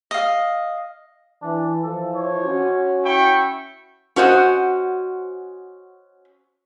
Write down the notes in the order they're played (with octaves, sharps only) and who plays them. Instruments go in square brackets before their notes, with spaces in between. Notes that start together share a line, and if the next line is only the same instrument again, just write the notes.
[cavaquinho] D#5 F5
[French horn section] E3 [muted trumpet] D4
[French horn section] E3 F3 [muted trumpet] A4
[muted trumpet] C#5
[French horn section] C#4 F#4
[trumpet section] E4 G5 C#6
[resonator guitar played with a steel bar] C#4 F#4 C5 D#5